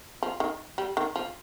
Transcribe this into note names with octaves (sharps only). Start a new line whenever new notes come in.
F3
D#3
G3
D#3
F3